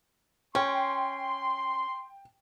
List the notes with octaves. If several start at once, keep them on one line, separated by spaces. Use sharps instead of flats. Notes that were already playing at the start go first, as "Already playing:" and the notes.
C#4 G5 C6